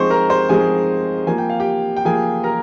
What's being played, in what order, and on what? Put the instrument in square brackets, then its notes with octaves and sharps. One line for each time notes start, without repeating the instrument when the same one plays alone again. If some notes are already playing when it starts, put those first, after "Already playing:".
Already playing: [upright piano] F3 G#3 C4 D#4 C5 C6 C#6
A#4 A#5
C5 C6
F3 G#3 C4 D#4 G#4 G#5
F3 A#3 F4 G#5
G5
F5
G4 G5
G5
F3 A#3 F4 G#4 G#5
A#4 A#5